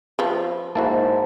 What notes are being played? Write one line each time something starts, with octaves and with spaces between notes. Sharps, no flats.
F3 B4
G#2 A#3 E4 F#4 C5 A5